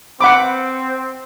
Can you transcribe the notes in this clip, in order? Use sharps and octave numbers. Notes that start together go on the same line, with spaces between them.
C4 F#5 B5 D6